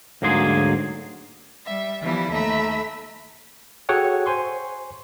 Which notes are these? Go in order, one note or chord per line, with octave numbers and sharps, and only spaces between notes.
D2 G#2 F#3 A#3 G#4 C6
G3 E5
E3 F3 G3 B3 E4
D#2 A3 E5 A#5 B5 E6
F#4 G#4 A4 C#5 F#5 G5
C5 G#5 C6 C#6